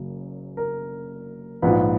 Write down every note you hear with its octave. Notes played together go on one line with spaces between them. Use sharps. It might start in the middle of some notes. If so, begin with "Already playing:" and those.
Already playing: F#1 F#2 C#3
A#4
A#1 G#2 F3 B4